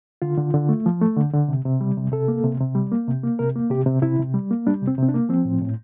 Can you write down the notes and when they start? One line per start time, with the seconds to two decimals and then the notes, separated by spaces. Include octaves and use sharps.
0.22 D3 F4
0.38 D3
0.54 D3
0.69 A3
0.86 F3
1.01 A3
1.16 D3
1.33 D3
1.48 C3
1.65 C3
1.81 G3
1.97 C3
2.12 C3 A4
2.28 A#3
2.44 C3
2.60 C3
2.75 G3
2.92 A#3
3.08 C3
3.23 A#3
3.39 C3 A#4
3.56 A#3
3.70 C3 G4
3.86 C3
4.02 C3 E4
4.19 C3
4.34 G3
4.51 A#3
4.67 G3 D4
4.82 C3
4.87 C4
4.98 C3 C4
5.08 D4
5.14 A#3
5.29 F3 C4
5.45 A2
5.62 A2